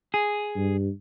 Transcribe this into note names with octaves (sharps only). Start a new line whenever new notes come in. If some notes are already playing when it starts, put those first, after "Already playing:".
G#4
G2